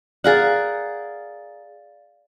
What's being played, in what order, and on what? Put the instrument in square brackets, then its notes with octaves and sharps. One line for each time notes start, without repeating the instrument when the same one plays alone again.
[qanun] G#4 A#4 F#5 [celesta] D5 F5 A6